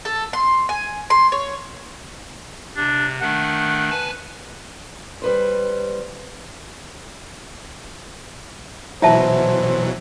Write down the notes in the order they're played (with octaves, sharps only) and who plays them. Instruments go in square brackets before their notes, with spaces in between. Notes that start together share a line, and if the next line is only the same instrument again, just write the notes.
[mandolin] A4
C6
G#5
C6
C#5
[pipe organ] C3 [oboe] D4
[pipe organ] D#3 A3 D4 [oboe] F#5
[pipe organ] B4 G#5 A5
[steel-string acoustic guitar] G3 B4 C5
[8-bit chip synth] B2 E3 F#3 [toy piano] E4 E5 A5 [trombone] C5